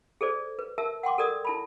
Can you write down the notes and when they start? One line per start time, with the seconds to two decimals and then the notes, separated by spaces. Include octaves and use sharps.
0.21 G#4 A4 C5 D5
0.59 B4
0.78 A#4 E5 A5 E6
1.03 F#5 G5 C6 D6
1.18 A4 A#4 D5 D#6
1.45 E4 A5 B5